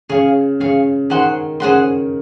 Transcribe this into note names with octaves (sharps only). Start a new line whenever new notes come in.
C#3 G#4 C#5 F5
C#3 G#4 C#5 F5
D#3 G#4 C5 F#5 C6
C#3 G#4 C5 F#5 C6